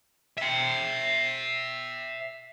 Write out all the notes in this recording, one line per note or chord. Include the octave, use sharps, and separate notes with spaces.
E5 G5